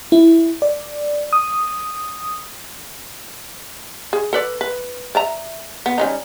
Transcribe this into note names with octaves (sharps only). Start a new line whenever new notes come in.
E4
D5
D#6
G#4
A4 B4 D5
B4
D5 E5 A#5
B3
G3 C#4 D#4